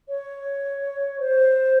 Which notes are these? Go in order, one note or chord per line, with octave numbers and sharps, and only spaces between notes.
C#5
C5